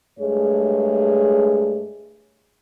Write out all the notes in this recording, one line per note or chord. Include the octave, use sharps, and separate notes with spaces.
G2 G#3 A3 G#4 C#5